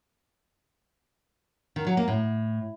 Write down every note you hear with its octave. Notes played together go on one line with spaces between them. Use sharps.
D#3
F#3
A#3
A2